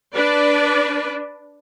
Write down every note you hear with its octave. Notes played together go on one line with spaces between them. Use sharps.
D4 B4 D5